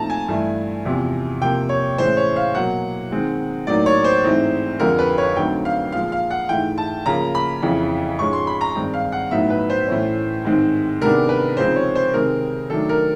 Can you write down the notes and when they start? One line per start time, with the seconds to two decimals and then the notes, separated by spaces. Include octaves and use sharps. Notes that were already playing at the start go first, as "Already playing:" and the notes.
Already playing: A#2 F3 A3 C4 D#4 A5 A#5
0.10 G#5
0.28 G2 E3 A3
0.85 E2 C3 F3
1.41 C3 F3 A#3 G5
1.69 C#5
1.98 A2 E3 G#3 C#4 C5
2.17 C#5
2.36 F5
2.55 B2 F#3 A#3 F#5
3.11 D#3 G#3 C4
3.67 A2 F#3 A#3 D#4 D5
3.86 C#5
4.04 C5
4.24 G#2 E3 A3 C4 D#4
4.80 F2 D3 F3 G#3 A#4
4.99 B4
5.18 C#5
5.36 D3 F#3 A3 C4 D#4 G5
5.65 F5
5.92 A#2 F3 G#3 F5
6.12 F5
6.30 F#5
6.49 G#2 E3 A3 G5
6.78 A5
7.06 C#3 F3 A#3 A#5
7.35 B5
7.62 F2 C#3 E3
8.19 G#2 F3 G#3 C#4 C#6
8.33 C6
8.47 B5
8.61 A#5
8.75 G2 D#3 G#3 C4 D#4
8.94 F5
9.12 F#5
9.31 A2 F#3 B3 D#4 E5
9.50 B4
9.70 C5
9.88 A2 E3 A3 C#4
10.45 G#2 D#3 G#3 C4
11.02 C3 D#3 G#3 B3 D4 A#4
11.29 B4
11.57 C#3 F3 G#3 C4 D#4 C5
11.76 C#5
11.95 C5
12.13 C3 D#3 G#3 C4 D#4 A#4
12.70 D#3 F#3 A3 D4 A4
12.89 A#4